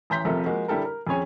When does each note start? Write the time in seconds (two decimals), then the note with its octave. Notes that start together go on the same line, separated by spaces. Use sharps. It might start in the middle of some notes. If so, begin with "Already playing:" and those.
0.10 A1 E3 A#5 C6 G6 B6
0.25 F1 A#1 C3 F4 A4 A#4
0.46 F3 G#3 A#3 F#4
0.68 D3 G3 E4 G4 A4 A#4
0.85 A#4
1.07 F2 C#4 G#4 C#5 G#5